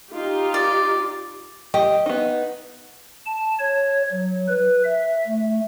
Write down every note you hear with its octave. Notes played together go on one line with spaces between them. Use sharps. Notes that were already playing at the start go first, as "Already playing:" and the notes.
D#4 F4 G4
D5
G4 D#5
B3 D#4
A5
C#5
F#3
B4
E5
A3